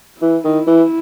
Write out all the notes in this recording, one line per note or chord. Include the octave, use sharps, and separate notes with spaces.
E3 E4
D#3
E3